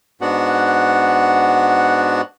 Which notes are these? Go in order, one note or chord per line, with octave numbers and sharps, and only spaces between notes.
G#2 B3 D4 F#4 F#5